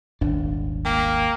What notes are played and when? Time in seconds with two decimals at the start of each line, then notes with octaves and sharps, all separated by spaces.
0.21 D#1 G#1 D4
0.85 A#3 G5